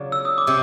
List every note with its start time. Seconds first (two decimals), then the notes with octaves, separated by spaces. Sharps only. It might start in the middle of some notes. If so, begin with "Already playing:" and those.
Already playing: C#3 F#3 D4 F4
0.12 E6
0.25 D#6
0.38 D6
0.47 C3